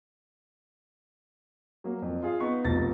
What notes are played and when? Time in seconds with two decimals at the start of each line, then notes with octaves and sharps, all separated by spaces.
1.84 F#3 A#3
2.02 F2
2.22 F4 G#4 F5
2.40 B3 D#4 C#6
2.64 F1 B1 F3 A6 A#6